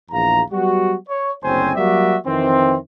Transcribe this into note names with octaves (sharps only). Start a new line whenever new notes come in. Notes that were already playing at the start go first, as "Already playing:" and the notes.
A#1 E2 F5 A#5
F#3 G3 B3 F#4
C#5
F#1 D2 C4 C#4 C5 G#5
F#3 G3 A#3 F#4 D5 E5
F2 D#3 E3 C4